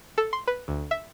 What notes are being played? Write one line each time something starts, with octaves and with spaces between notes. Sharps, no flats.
A4
C6
B4
D2
E5